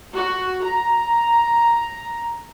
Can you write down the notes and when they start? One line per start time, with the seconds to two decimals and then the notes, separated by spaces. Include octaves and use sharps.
0.14 F#4
0.62 A#5